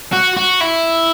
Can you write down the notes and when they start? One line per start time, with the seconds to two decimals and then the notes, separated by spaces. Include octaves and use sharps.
0.13 F#4
0.37 F#4
0.61 E4